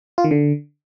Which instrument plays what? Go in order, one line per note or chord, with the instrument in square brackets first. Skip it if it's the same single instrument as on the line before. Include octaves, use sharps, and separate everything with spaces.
[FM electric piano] F4
D#3
D3